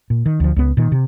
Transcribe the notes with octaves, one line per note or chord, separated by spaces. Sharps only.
A#2
D#3
D2 F3
C#2 B3
A#2 D#3
C3